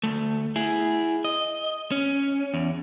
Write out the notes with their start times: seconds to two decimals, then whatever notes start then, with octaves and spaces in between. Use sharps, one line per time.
0.03 D2 A3
0.56 E4 G#4
1.25 D#5
1.92 C#4
2.54 E2